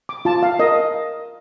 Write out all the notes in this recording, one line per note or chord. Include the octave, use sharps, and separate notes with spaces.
D6
F4 A5
F5
A#4 D#5